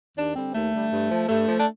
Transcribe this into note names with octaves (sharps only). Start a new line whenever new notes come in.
D#2 D4
D3 G3 C4
D#2 A3
D3 G3
G2
F3
G2 A3
F3
D4